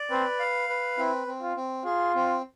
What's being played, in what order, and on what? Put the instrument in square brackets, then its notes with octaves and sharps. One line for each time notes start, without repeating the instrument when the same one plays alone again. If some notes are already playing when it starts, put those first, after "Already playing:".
Already playing: [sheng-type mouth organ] D5
[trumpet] C4 [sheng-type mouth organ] B4
[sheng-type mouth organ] F5
B4
[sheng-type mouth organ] C4 [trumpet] E4
[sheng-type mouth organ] C4
[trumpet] F4
[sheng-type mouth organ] C4
[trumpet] F4 [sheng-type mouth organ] G#4
[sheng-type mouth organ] C4